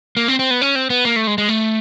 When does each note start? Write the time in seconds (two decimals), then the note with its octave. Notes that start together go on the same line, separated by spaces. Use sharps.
0.17 A#3
0.28 C4
0.39 C4
0.51 B3
0.62 C#4
0.75 C4
0.90 B3
1.05 A#3
1.16 A3
1.27 G#3
1.38 G#3
1.49 A3